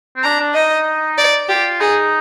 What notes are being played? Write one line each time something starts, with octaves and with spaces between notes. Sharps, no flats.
C4
D4 A#5
D4
D#4 D#5
D5
F4 G4
D#4 G#4